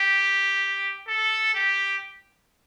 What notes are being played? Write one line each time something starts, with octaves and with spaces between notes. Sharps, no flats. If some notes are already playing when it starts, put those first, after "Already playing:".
Already playing: G4
A4
G4